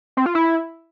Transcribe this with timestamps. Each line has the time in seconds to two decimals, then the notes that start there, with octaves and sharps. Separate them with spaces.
0.17 C4
0.26 F4
0.35 E4